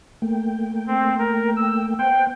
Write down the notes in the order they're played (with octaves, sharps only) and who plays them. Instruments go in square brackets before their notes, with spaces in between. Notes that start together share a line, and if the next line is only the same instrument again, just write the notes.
[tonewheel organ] A3 A#3 G5
[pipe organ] C4
A#4
E6
[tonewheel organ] B3 C5 F#5 [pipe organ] G5